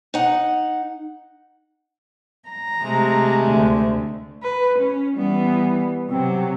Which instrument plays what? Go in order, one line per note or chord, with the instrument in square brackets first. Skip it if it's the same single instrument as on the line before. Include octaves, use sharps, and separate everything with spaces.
[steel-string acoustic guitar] D#4 F#5
[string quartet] A#5
[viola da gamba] C3 G#3 A3
[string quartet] D2
[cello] B4
C#4
[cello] E3 B3 [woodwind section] G3
[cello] C3 F#3 [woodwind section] C4